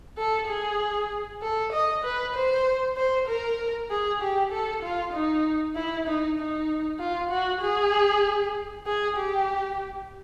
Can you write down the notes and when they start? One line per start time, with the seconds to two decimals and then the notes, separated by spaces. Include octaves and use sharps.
0.18 A4
0.48 G#4
1.42 A4
1.72 D#5
2.04 B4
2.34 C5
2.97 C5
3.27 A#4
3.90 G#4
4.21 G4
4.52 A4
4.83 F4
5.13 D#4
5.75 E4
6.07 D#4
6.39 D#4
6.99 F4
7.30 F#4
7.62 G#4
8.86 G#4
9.17 G4